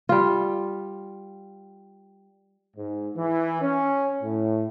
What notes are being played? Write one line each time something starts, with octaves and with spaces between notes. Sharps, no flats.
G3 F4
G#2
E3
C#4
A2